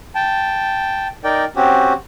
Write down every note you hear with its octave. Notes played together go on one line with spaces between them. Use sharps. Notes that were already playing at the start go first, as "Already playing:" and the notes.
G5 A5
D#4 A#4 D5 G5
C4 C#4 F#4 G4